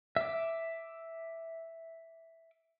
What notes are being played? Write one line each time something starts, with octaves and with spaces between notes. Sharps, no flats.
E5 D6